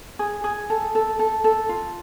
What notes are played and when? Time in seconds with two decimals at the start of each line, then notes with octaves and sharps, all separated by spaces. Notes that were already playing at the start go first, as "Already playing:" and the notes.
0.19 G#4
0.44 G#4
0.70 A4
0.95 A4
1.19 A4
1.44 A4
1.69 F4